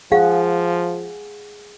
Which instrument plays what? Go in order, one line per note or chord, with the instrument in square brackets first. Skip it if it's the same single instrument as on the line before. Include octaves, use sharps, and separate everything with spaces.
[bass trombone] F3 [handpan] G#4 F#5 [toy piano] F5